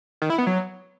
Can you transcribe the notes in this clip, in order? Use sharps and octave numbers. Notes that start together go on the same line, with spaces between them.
D#3
E4
B3
F#3